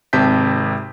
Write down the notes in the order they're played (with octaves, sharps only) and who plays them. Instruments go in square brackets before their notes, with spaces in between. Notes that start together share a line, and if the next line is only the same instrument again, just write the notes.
[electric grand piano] G#1 C3 A5 G6 B6